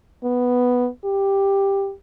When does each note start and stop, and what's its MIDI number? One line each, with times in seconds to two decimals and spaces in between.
0.24 0.89 59
1.05 1.93 67